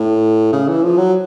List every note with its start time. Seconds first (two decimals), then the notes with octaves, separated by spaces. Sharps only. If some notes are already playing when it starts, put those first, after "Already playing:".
Already playing: A2
0.52 C#3
0.68 E3
0.84 F3
0.98 F#3